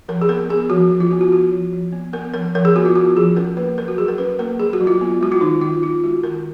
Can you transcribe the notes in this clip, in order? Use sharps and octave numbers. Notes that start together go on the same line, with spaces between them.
F3 A#4
G#4
B3 A#4
B3 G#4
F3 F#4
F3
F4
B3 F#4
F#4
B3 F#4
F3
F3
B3
B3 A#4
F3 A#4
F3 A#4
G#4
B3 F#4
F4
B3 F#4
F3 G#4
C#4 A#4
A#3 B4
F#3 A#4
F#4
F#3 G#4
A#4
C#4 B4
A#3 A#4
F#3 G#4
F#4
F#3
F4
B3
G#3 F#4
F4
D#3 D#4
D#3 F4
B3 F4
G#3 F#4
D#3 A#4